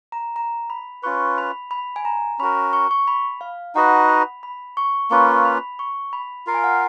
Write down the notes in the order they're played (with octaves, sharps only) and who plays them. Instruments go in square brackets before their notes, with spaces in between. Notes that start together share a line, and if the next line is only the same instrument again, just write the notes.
[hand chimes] A#5
A#5
B5
[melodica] C#4 F4 B4 [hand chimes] C#6
[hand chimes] B5
B5
G#5
A#5
[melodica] C#4 F#4 A#4 [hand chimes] B5
[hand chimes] C#6
C#6
B5
F5
[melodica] D#4 F#4 B4 D#5 [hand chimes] F#5
[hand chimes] B5
B5
C#6
[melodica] A#3 C#4 F4 B4 [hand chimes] C#6
[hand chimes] B5
C#6
B5
[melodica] F4 A#4 F5
[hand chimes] G#5
F#5